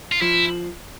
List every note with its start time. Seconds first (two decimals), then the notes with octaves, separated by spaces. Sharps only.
0.12 F4
0.21 F3 E4